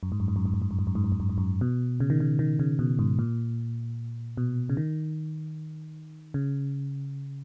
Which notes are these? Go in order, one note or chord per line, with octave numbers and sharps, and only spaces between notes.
F#2
G#2
F#2
G#2
F#2
G#2
F#2
G#2
F#2
G#2
F#2
G#2
F#2
G#2
F#2
G#2
F#2
B2
C#3
D#3
C#3
D#3
C#3
B2
G#2
A#2
B2
C#3
D#3
C#3